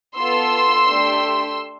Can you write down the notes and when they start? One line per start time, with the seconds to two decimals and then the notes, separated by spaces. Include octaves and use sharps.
0.17 B3 F4 A4 C6 E6
0.88 A3 D4 G4